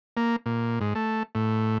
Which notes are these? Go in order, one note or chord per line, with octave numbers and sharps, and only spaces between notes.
A#3
A#2
G#2
A3
A2